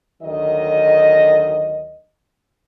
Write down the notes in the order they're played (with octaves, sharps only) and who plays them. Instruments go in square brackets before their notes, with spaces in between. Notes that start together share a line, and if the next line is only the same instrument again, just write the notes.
[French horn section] D2 D#3 F#3 D#5